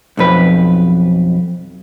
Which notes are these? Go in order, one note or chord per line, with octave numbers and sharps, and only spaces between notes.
B1 F2 B4